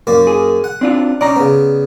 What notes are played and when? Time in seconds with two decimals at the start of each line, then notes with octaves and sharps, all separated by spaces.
0.07 F#2 A#3 D5
0.27 G#4
0.64 F#5
0.81 C4 D4 F4
1.21 C#4 D#4 D5 A#5
1.36 C#3 B3